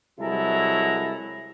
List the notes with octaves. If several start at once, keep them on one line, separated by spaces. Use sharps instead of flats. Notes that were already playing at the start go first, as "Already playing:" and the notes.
C2 F#3 G#3 E4 A4 A#5